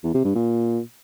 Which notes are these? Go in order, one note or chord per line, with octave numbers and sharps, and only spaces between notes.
E2
C3
G2
A#2